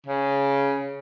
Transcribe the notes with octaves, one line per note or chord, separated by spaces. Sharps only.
C#3